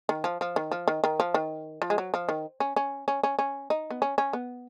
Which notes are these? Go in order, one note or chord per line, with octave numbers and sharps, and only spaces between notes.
D#3
F3
F3
D#3
F3
D#3
D#3
F3
D#3
F3
G#3
F#3
F3
D#3
C#4
C#4
C#4
C#4
C#4
D#4
B3
C#4
C#4
B3